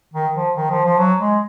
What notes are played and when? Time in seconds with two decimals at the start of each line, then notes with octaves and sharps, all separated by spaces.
0.14 D#3
0.35 F3
0.56 D#3
0.71 F3
0.86 F3
0.99 F#3
1.20 G#3